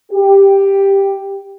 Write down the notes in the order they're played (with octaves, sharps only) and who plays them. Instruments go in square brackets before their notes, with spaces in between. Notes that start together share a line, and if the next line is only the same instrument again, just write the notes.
[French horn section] G4